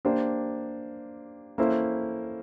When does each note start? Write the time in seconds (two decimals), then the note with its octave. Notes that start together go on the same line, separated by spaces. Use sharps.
0.05 A#3 D4 G4 C5
1.58 A#3 C#4 E4 A4 C5